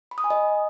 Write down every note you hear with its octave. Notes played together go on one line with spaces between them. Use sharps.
B5
D#6
G#5
D#5